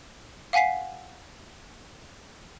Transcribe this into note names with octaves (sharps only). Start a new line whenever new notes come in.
F5 F#5 G#5 B6 C7